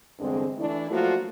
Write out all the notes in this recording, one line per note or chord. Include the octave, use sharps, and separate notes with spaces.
E2 G2 D3 G#3 C4
E3 A3 D4 E4
F3 F#3 A3 A#3 F4 F#4